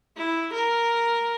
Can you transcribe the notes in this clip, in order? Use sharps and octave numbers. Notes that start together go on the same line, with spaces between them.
E4
A#4